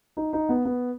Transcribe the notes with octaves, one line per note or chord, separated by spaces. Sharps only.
D#4
D#4
B3
B3